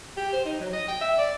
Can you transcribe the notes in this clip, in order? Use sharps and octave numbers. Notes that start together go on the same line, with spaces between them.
G4
C5
D#4
F#3
D#5
G5
E5
D5